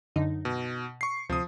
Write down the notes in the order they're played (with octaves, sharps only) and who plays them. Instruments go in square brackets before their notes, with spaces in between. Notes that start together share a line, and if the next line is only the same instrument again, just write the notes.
[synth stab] F#2 D3 D#4
[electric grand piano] B2
C#6 C7
[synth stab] D2 C3 [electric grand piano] F3 D#6